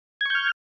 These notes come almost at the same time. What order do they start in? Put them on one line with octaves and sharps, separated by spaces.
G#6 C#6 G6 F6